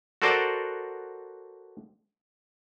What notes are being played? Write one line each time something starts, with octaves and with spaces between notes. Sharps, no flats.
F#4 A4 A#4 C5 D5 F#5